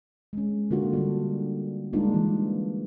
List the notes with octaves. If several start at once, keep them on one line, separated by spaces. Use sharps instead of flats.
G#3 C#4
D3 A#3 F4 F#4
G3 A#3 D4
G3 G#3 A#3 D4 D#4 F4
E3